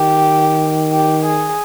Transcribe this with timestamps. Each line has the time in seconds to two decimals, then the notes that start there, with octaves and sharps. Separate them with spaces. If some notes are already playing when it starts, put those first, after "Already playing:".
Already playing: D#3 G4
0.92 G4
1.25 G#4